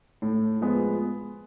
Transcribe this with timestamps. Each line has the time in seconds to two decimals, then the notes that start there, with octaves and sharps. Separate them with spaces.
0.22 A2
0.61 F3 G#3 B3